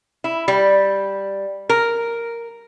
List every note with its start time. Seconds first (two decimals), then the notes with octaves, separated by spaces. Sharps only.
0.24 E4
0.48 G3
1.69 A#4